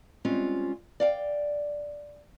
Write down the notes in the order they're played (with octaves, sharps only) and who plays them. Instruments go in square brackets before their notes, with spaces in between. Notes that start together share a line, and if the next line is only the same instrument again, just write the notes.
[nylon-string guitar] G3 G#3 C4 C#4 F4
D5 F5 G5